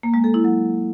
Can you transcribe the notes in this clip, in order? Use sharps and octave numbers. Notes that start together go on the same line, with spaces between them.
A#3
G#3
A4
E4
F#3